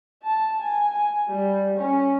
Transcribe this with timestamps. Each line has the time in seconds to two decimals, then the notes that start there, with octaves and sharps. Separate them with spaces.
0.23 A5
0.60 G#5
0.93 G#5
1.28 G3
1.77 C#4